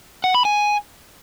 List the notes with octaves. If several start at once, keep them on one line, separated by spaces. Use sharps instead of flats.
F#5
B5
G#5